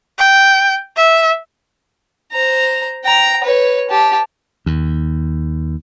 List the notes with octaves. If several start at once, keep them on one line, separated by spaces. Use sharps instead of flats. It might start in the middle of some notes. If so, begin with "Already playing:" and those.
G5
E5
C5 A#5
G5 A#5
B4 C#5
G4 A5
D#2